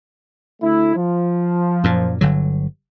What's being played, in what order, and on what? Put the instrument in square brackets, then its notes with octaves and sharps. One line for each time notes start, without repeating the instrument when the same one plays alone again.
[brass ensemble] D2 A3 E4
F3
[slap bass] F#2 A#2
G1 D3 F#3